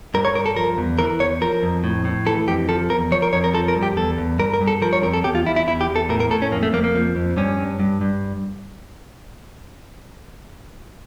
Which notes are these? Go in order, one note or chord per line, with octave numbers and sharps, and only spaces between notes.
G2 A#4
C#5
G2 A#4
A4
F3 A#4
E2
E3 A#4
E2 C#5
F3 A#4
F2
A2
A2
E3 A4
F2 G4
F3 A4
E2 A#4
F3 C#5
A#4
F2 C#5
A#4
F3 A4
A#4
G2
G4
E2 A4
E2
G2 A#4
A#4
G2
A4
F3 A#4
C#5
F2 A#4
A4
E2 G4
F4
E2 E4
E4
E2 E4
G4
E2
A4
A2 A#4
A#4
A2 A4
C#4
F2 A#3
A3
F2 A#3
A#3
F3
F2
G2 C#4
G2
G2
G2